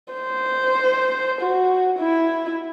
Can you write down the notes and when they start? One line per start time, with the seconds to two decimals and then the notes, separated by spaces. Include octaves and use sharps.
0.13 C5
1.41 F#4
1.99 E4